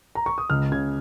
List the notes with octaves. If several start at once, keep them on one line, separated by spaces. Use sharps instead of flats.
A#5
C#6
D#6
C#2 F6
C#3 G#6